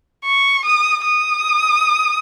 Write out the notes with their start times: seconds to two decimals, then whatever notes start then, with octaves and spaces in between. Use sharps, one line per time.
0.24 C#6
0.65 D#6
1.05 D#6